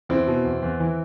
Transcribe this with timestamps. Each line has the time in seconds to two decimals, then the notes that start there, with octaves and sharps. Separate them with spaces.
0.09 E2 C4 E4
0.27 B2
0.45 E2
0.63 E2
0.80 E3